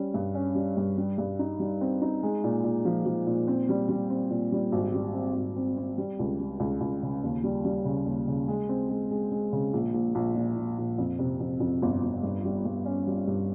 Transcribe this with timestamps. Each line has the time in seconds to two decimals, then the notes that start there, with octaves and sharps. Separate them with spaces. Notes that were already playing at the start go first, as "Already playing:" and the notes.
Already playing: G3 C#4
0.14 G2
0.35 C#4
0.55 G3
0.77 G2
0.98 G3
1.18 G2
1.39 D#4
1.60 G3
1.81 C4
2.02 D#4
2.23 G#3
2.44 A#2
2.64 A#2
2.85 F3
3.06 F3
3.27 A#2
3.48 C4
3.69 G3
3.89 G3
4.10 C4
4.31 A#2
4.52 G3
4.72 G#1
4.94 G3
5.14 C4
5.35 G#1
5.56 C4
5.77 C4
5.98 G3
6.19 C#2
6.40 G3
6.60 C#2
6.81 C#2
7.03 C#3
7.24 D#2
7.44 G3
7.65 G3
7.85 C#3
8.06 D#2
8.28 C#3
8.48 G#3
8.69 C4
8.89 G#3
9.11 G#3
9.32 G#3
9.53 C#3
9.73 A#1
9.94 A#1
10.15 A#1
10.35 A#2
10.56 A#2
10.78 A#1
10.98 F2
11.19 C3
11.40 F2
11.60 F2
11.82 G1
12.03 G1
12.23 G2
12.45 G3
12.65 G2
12.85 C#4
13.07 G3
13.27 G2